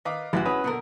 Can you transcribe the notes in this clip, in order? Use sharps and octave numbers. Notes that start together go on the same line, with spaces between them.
D#3 B4 D#5 F5 D6
A1 G#3 B3 F#4
C#4 E4 B4 D#6
F#2 B2 D3 A#3 A4 A#4